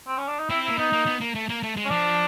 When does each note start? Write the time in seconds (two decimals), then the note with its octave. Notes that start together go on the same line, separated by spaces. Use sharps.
0.07 C4
0.18 C#4
0.28 D4
0.39 D#4
0.50 C4 E4
0.65 A#3 E4
0.78 B3 D#4
0.92 A#3
1.06 B3
1.20 A#3
1.35 A3
1.49 A#3
1.63 A3
1.76 G#3
1.85 C#4
1.90 F3 D4